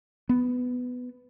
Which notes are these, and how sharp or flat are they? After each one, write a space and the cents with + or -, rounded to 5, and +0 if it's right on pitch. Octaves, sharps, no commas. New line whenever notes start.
B3 +10